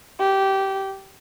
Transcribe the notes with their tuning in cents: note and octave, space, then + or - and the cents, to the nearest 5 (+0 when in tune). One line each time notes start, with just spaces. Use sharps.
G4 -15